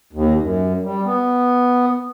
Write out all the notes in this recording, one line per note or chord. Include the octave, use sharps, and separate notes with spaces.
D#2
F#2
G3
B3